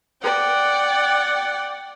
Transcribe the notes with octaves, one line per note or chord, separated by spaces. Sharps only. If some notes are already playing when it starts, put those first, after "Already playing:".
D5 F#5 G5